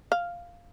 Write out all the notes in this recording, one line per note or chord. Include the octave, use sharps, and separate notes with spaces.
F5